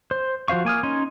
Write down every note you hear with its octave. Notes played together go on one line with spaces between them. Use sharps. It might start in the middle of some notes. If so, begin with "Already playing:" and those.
C5
F3 F#4 C5 F5 C#6
A#3 G#5 D#6 F6
C#4 D#4 G#5 C6